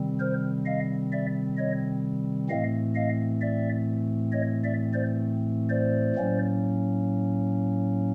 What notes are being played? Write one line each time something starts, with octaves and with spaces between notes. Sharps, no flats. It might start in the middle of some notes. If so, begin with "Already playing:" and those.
Already playing: C3 D#3 G3 C4
A#4 C5
D#5 F5
D5 E5
C#5 D#5
A2 E3 A3 C4 D#5 F5
D#5 F5
D5 E5
C#5 D#5
D5 E5
C5 D5
C5 D5
A2 F#3 A#3 C#4